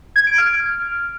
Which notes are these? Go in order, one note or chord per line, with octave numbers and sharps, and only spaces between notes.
G#6
D7
F6